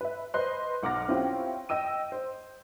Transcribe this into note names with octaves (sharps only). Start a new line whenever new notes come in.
B4 E5
B4 C5 D#5 C6 F#6
B1 F#5 D6 F6 A#6
C4 C#4 E4 F4 G4 G5
D#5 G5 E6 D#7
C5